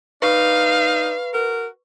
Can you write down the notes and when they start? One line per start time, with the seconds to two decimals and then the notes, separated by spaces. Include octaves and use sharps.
0.22 A#3 D4 D#4 B4 F5 C#6
1.33 F#4 A#4